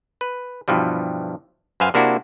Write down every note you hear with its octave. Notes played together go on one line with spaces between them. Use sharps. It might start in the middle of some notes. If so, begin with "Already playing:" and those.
B4
G2 B2 E3 F3 G3
F#2 B4 C5 F5 G#5
C3 A#3 D4 E4 F#4